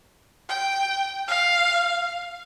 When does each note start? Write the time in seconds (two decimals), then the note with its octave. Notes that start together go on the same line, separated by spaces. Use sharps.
0.49 G5
1.28 F5